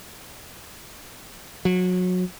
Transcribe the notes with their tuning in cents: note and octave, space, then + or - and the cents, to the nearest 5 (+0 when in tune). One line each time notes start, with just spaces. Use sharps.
F#3 -25